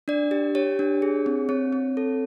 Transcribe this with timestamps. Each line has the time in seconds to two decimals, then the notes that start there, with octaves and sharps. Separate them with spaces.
0.08 D4 D5
0.31 G4
0.55 G4 C#5
0.79 D4
1.02 G#4
1.26 C4
1.49 C4 C#5
1.73 C4
1.97 A4